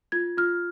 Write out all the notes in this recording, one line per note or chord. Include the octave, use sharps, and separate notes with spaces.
F4 G#6
F4 F6